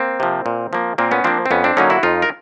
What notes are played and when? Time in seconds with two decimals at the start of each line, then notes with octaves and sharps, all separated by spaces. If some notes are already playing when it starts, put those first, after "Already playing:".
Already playing: A#3 C4
0.20 C3 F3
0.46 A#2
0.73 F3 A#3
0.98 A#2 A#3 C4
1.11 B3 C#4
1.24 F3 A#3 C4 D4
1.46 C4
1.51 F2 B3 C#4
1.64 C4 D4
1.77 D3 F#3 A#3 C#4 D#4
1.90 E4 F#4
2.03 F2 D#4 F4
2.22 A#4